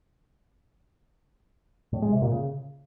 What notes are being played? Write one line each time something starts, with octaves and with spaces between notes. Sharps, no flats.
A2
G#3
C3
A#2
C#3